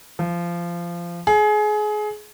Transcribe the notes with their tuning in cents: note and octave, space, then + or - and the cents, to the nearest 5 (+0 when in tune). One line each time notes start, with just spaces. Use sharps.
F3 -20
G#4 +25